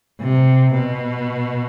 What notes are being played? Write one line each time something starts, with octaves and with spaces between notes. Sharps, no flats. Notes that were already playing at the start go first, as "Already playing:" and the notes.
C3
B2